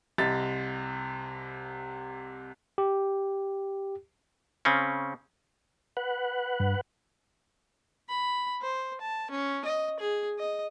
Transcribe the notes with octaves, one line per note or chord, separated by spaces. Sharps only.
C2 C3 D#5 A6 B6
G4
C#3 C4 C#4
B4 F#5
G2
B5
C5
A5
C#4
D#5
G#4
D#5